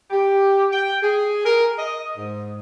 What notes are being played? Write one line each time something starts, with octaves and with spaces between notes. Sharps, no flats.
G4
G5
G#4
A#4
D#5
G#2